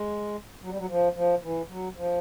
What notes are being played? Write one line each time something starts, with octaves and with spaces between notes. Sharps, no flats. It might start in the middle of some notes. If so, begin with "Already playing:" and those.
Already playing: G#3
F#3
G3
F#3
F3
F3
E3
F#3
F3